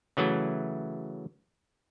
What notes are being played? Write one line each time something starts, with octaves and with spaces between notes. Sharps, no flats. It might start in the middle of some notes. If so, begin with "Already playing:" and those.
C#3 E3 F#3 A3